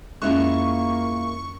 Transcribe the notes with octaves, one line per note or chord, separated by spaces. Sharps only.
F2 G#3 A#3 C#4 E4 F4 C#6 F#6